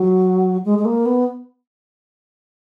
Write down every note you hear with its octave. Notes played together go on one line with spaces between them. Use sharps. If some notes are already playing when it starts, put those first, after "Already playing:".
Already playing: F#3
G#3
G#3
A#3
B3